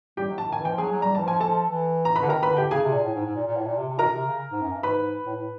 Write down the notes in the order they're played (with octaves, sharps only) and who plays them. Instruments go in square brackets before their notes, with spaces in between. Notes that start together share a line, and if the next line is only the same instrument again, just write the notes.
[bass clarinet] G3 [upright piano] G4 G5
[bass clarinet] F#3
[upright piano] A5
[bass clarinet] D#3
[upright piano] G#5
[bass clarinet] E3
[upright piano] G5
[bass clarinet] F3
[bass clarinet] F#3 [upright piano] G#4 G#5
[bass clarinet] F#3
[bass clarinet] G3 [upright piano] A#5
[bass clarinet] E3 [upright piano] A5
[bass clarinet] F3 [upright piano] G#5
[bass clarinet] F3 [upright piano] A4 A5
[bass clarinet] E3
[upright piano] A#5
B4 B5
[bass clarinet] D3
[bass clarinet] D#3 [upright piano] A#4 A#5
[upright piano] B4 B5
[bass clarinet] D3
[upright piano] G4 G5
[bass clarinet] C#3 [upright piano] G#4 G#5
[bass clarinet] C3
A#2
A2
G#2
G#2
A#2
A#2
A2
A#2
C3
C3
[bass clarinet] B2 [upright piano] A#4 A#5
[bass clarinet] C3
C#3
G#2
F#2
G2
[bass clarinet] G#2 [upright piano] B4 B5
[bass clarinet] A2
A2